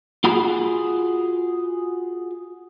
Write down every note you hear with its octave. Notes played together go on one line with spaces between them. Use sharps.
F4 F#4 G#4 B5